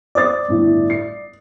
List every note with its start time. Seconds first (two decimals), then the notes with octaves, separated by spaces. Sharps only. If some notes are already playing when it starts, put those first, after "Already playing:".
0.15 C5 D5 D#6 A6
0.48 G1 A2
0.90 C7